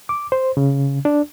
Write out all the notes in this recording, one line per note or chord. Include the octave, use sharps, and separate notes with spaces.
D6
C5
C#3
D4